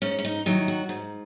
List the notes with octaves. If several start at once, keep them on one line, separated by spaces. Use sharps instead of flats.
G#2 C#4
C#4
D#4
D#3 F#3 E4
F#4
G#2